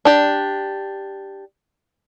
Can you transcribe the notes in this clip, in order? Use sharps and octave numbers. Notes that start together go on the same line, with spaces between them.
D4 G4